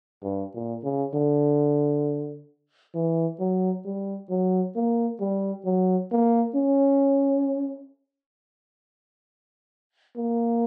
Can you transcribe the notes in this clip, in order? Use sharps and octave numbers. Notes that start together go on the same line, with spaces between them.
G2
A#2
C#3
D3
E3
F#3
G3
F#3
A#3
G3
F#3
A#3
C#4
A#3